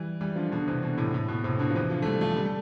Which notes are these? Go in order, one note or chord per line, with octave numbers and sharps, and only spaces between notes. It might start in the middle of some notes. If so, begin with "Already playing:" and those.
Already playing: E3 G3
E3 G3
D3 F3
B2 D3
C3 E3
B2 D3
A2 C3
A2
B2
A2 C3
B2 D3
F3
C3 E3
D3 F3
A3
E3 G3
F3 A3
G3
A3